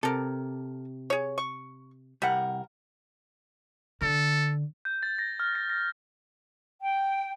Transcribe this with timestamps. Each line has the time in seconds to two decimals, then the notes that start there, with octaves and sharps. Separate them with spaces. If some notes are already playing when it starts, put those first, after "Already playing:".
0.03 C3 A4 A#4
1.10 G#4 C#5
1.38 C#6
2.22 C2 G3 A#4 F#5
4.01 D3 A4
4.85 G6
5.03 A6
5.19 A#6
5.40 F6
5.55 A#6
5.70 A#6
6.81 G5